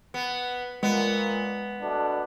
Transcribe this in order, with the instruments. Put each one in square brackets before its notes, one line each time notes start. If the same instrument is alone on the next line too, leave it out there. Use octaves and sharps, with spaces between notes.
[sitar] B3
[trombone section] A#2 [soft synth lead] G#3 [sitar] B3
[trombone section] B2 A3 D4